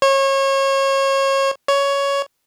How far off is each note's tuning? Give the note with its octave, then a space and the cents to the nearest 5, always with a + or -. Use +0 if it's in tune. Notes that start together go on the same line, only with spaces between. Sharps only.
C#5 -30
C#5 +10